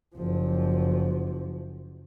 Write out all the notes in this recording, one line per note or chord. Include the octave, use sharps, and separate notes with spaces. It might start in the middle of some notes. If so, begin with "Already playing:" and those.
F#1 F3